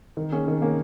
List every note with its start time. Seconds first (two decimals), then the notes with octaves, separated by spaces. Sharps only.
0.17 D#3
0.32 A#3 C#4 G#4
0.48 D#3
0.62 A#3 C#4 G#4